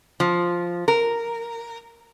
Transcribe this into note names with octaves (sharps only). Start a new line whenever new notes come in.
F3
A#4